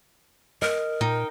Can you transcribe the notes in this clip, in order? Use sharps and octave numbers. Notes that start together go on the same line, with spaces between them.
A#4 D#5
A#2 D#4 G5